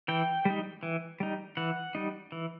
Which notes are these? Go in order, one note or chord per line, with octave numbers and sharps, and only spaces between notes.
E3 G5
G3 D#4
E3
G3 D#4
E3 F#5
G3 D#4
E3